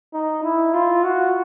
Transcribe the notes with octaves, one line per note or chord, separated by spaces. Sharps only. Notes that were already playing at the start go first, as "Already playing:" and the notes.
D#4
E4
F4
F#4